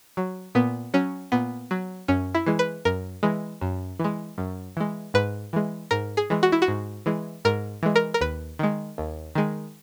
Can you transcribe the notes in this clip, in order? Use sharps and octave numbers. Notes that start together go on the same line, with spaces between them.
F#3
A#2 B3
F#3 C#4
A#2 B3
F#3
F#2 C#4
E4
E3 G#3
B4
F#2 A#4
E3 G#3
F#2
E3 G#3
F#2
E3 G#3
G#2 B4
E3 G#3
G#2 A#4
G#4
E3 G#3
F#4
E4
F#4
G#2
E3 G#3
G#2 A#4
E3 G#3
A#4
A#4
D#2 B4
D#3 G#3
D#2
D#3 G#3